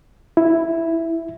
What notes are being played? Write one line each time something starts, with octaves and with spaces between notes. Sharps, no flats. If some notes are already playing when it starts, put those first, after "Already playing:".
E4